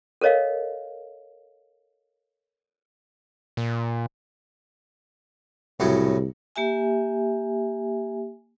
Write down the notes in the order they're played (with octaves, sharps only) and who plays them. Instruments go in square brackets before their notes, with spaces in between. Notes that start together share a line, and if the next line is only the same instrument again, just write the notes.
[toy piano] A4 A#4 C#5 D#5 F5
[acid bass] A#2
[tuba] C2 [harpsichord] A2 C#3 F#3
[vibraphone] A#3 G4 E5 G#5